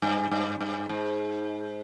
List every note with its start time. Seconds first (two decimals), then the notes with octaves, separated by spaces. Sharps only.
0.02 G2
0.31 G2
0.60 G2
0.89 G#2